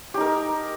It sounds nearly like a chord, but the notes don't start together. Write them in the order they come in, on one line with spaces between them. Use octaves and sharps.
G4 D#4 A#4